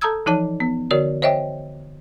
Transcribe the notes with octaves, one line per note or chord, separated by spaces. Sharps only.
A4 A5 A#5 D#6 E6 G#6
E3 F3 D#4 C#5 A5
B3
D3 F#4 A#4 C#5 D5
C5 C#5 D#5 E5 G5